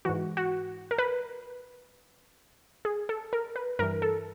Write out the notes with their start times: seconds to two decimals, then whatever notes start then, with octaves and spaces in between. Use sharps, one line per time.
0.05 G#2 E3 F#4
0.37 F#4
0.91 A#4
0.98 B4
2.85 G#4
3.09 A4
3.33 A#4
3.56 B4
3.79 G2 E3 A#4
4.02 A4